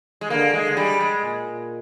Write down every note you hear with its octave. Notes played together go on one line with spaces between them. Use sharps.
G#3
D3 A#3
G#3
D3
G3
G#3
A#2